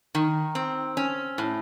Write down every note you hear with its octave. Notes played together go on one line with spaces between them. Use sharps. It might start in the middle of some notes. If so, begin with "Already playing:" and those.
D#3
C4
C#4
A2